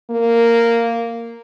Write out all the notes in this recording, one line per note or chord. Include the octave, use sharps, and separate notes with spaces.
A#3